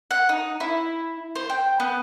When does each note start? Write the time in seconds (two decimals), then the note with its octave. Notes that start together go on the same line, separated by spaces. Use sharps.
0.11 F#5
0.29 D#4
0.60 E4
1.36 C5
1.50 G5
1.80 B3